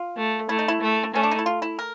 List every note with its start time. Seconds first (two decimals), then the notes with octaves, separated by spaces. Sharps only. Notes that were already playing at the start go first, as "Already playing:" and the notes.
Already playing: F4
0.17 A3
0.49 A3 E4
0.59 D#4
0.68 E4
0.81 A3
1.14 A3 C#4
1.23 D4
1.31 D#4
1.39 E4
1.46 F4
1.62 E4
1.79 A#4